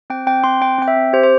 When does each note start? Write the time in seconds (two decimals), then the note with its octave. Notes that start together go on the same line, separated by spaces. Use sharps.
0.10 C4 G5
0.27 C4 G5
0.44 C4 C6
0.61 C4 G5
0.79 C4 G5
0.88 E5
0.96 C4
1.13 G4 C5
1.23 C5